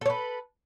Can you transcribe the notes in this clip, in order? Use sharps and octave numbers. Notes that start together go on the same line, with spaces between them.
A4 B4 C#5